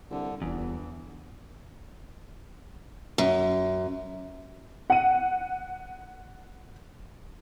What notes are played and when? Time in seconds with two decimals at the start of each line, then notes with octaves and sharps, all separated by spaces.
0.10 C2 D3
0.42 D1 G1 E2 E3
3.18 F#2
4.90 F#5 D#7